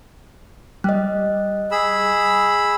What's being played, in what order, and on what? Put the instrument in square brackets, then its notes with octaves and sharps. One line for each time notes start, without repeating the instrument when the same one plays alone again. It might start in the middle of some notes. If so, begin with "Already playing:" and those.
[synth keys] G3 [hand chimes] D#5 F#6
[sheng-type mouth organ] G#4 B5 E6